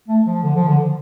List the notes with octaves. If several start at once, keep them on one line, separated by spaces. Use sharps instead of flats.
A3
F3
D3
F3
D3